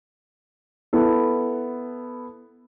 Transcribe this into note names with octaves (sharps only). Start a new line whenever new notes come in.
B3 E4 A4